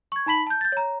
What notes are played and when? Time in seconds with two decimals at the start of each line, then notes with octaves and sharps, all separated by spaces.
0.12 C#6 G#6
0.26 D#4 A5 B5 B6 F#7
0.47 A5 G6
0.61 G6 A6
0.72 C#5 A#5